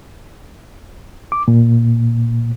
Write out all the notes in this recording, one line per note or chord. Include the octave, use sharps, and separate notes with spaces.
D6
A#2